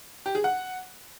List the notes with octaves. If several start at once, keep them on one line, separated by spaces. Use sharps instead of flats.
G4
G#4
F#5